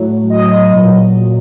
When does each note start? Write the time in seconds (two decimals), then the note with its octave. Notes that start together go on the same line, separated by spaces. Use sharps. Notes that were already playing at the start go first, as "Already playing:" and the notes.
Already playing: A2 F#3
0.30 D#5
0.73 A#2 F#3